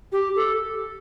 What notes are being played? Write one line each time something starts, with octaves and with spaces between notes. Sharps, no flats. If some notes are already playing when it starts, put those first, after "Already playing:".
G4
A4